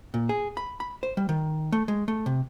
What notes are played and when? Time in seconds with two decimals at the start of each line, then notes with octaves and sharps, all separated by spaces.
0.14 A#2
0.29 G#4
0.57 B5
0.80 B5
1.03 C5
1.17 G3
1.29 D#3
1.72 A3
1.88 G#3
2.08 A3
2.26 C3